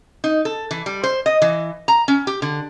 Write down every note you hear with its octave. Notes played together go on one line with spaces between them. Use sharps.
D#4
A4
E3
G3
C5
D#5
E3
A#5
C#4
G4
D3